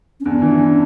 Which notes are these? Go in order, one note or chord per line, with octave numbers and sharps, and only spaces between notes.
C#4
E2 D4
E3
C#3